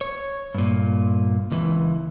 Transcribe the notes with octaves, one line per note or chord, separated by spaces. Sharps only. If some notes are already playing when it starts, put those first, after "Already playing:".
C#5
G2 A#2
C#2 E3